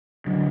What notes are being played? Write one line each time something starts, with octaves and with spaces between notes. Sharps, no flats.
D3 F#3